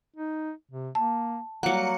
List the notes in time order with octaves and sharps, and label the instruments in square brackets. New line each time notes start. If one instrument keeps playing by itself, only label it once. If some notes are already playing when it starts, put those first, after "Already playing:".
[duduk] D#4
C3
[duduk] A#3 [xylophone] A5
[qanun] F#3 A#3 [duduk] G3 [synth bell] F#5 C#7